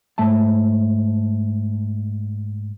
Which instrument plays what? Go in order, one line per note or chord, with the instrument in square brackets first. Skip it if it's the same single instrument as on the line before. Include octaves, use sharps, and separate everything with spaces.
[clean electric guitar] G#2 A3 E5 A5